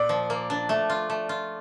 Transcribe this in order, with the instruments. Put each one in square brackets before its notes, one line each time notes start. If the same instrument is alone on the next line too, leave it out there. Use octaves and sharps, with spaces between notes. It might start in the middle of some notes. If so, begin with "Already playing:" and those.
Already playing: [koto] A#2 [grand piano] D5
[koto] F3
A#3
D4
A3
F4
A3
F4